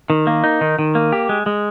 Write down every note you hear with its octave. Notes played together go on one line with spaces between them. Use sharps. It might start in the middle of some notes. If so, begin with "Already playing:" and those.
D#3
A#3
D#4
D#3
D#3
A#3
G4
G#3
G#3